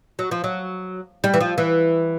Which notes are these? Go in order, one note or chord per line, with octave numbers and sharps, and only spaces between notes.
F#3
F3
F#3
G3
E3
F3
E3